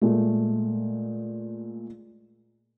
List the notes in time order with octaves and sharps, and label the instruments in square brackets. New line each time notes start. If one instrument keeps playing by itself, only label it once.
[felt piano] A#2 G#3 A3